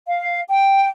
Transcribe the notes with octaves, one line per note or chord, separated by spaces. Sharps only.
F5
G5